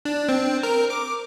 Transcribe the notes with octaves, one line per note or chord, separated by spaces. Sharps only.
D4
C4
A#4
D6